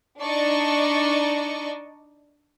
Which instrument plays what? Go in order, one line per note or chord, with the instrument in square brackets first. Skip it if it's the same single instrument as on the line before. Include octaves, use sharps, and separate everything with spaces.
[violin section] D4 D#4 D5 D#5 C#6